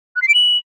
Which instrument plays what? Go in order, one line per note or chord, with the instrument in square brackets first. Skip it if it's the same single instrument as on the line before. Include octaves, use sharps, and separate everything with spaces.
[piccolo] F#6
C7
D7
F#7